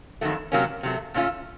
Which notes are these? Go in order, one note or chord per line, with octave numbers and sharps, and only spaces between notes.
F2 D#3 F#3 A3
C3 F#3 A#3 C#4
C3 F#3 A3
A#2 A3 C#4 F4